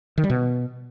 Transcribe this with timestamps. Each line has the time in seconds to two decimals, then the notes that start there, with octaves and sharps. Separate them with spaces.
0.18 D#3
0.24 G3
0.30 B2